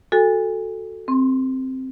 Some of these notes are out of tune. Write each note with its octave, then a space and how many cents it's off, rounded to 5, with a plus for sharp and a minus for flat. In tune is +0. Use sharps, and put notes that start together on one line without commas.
F#4 -5 A4 +0 G#5 -35
C4 +0 C6 +35